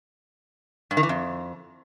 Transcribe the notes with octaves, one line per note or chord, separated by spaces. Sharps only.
G2
D#3
E3
F2